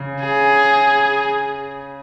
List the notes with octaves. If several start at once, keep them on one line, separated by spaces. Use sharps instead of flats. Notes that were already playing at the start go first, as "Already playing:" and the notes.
Already playing: C#3
G#4